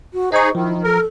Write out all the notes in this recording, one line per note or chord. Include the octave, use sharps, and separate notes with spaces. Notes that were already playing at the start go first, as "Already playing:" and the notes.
F#4
D#4 G#4 C5 D#5 C#6
D#3 F3 E4
A4 A#4